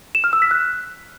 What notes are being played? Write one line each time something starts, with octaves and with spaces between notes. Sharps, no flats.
E7
F6
E6
B6
F#6